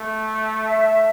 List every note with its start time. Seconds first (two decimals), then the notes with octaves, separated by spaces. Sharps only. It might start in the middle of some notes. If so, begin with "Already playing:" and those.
Already playing: A3
0.66 E5